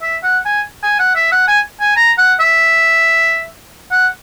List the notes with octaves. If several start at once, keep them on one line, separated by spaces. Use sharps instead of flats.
E5
F#5
G#5
G#5
F#5
E5
F#5
G#5
G#5
A#5
F#5
E5
F#5